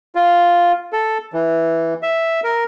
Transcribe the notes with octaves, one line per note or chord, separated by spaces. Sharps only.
F4
A4
E3
E5
A#4